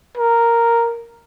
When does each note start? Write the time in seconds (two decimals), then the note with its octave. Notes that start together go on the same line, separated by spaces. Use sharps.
0.17 A#4